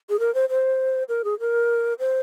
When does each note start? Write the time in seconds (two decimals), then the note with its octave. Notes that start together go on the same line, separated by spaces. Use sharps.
0.09 G#4
0.20 A#4
0.35 C5
0.49 C5
1.09 A#4
1.24 G#4
1.40 A#4
1.99 C5